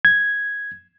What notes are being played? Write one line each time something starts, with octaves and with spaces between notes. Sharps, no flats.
G#6